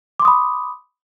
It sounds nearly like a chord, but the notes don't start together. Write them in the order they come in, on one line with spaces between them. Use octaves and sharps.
D6 C6 D#6 B5